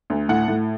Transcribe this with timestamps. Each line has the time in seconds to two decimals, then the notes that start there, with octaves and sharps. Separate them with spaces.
0.10 D2
0.29 A2 F#5
0.48 A2